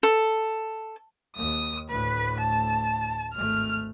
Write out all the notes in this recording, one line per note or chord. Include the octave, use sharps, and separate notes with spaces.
A4
D#2 A#3 D#6
D2 A2 B4
A5
G#1 A3 F6